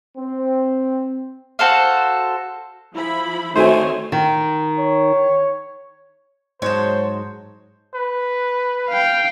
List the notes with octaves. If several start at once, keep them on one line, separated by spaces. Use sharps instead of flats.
C4
F#4 A4 C5 F5
F3 E4 B5
D#3 A3 C4 D#4 F#4 C5 C#5 G#5
D#3
C#5
G#2 F#3 G#3 C5 C#5 A5
B4
F5 G5